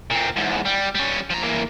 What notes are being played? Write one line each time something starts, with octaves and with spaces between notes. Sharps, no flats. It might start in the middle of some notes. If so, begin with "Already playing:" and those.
A#2 C4
E2 G#2
G3
G3 C#4
F3 A#5
E3 A#3